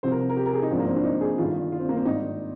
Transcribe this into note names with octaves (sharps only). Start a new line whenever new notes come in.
C2 C3 F3 C5
A#4
A#4
G4
A#4
G#4
D#4
G#1 G2 F3 C4
A#3
C4
D4
D#4
G#4
G1 G2 D#3 F4
F4
C4
A#3
C4
G#1 G2 D#3 D#4